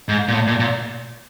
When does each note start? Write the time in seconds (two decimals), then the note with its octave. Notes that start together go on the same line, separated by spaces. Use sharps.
0.08 G#2
0.28 A#2
0.34 A2
0.47 A#2
0.60 A#2